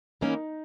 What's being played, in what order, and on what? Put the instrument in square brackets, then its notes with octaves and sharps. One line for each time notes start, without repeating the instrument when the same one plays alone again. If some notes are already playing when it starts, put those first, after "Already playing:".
[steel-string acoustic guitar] E3 A#3 C#4 [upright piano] D#4